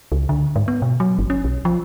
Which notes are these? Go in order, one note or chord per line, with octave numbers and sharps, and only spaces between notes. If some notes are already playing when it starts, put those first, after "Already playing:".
C#2
D3
G#2
B3
B2
F#3
G1
C#4
B1
F3